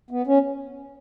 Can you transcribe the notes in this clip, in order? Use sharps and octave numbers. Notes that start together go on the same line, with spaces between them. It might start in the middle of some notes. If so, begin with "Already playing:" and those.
B3
C#4